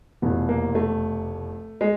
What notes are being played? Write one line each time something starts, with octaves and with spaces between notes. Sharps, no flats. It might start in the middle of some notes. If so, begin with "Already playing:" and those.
F1 E2 B2 B3
A#3
A3
G#3